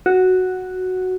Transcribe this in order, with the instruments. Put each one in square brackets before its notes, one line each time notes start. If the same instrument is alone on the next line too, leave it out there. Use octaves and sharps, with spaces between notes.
[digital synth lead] F#4